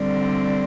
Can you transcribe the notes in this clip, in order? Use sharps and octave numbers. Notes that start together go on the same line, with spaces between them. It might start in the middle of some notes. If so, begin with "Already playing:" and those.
Already playing: D3 G3 C4